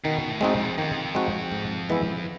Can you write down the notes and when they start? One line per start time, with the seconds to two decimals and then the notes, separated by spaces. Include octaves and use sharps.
0.05 B2 D#3
0.29 A2
0.41 G#3 C4 D#4 F#4
0.54 F2
0.78 F2 D#3
1.15 G#3 C4 D#4 F#4
1.52 G#2
1.89 E3 G#3 B3 E4